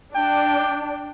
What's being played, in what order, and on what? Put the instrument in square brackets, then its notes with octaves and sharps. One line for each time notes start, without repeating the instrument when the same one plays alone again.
[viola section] D4 [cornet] G5